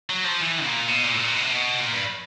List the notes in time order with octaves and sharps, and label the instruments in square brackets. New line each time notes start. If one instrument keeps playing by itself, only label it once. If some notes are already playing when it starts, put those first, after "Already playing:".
[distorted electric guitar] F#3
F3
E3
A#2
B2
A#2
A2
A#2
B2
C3
B2
A#2
G2